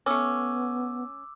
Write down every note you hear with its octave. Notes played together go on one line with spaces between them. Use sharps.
A3 B3 C#4 D6 E6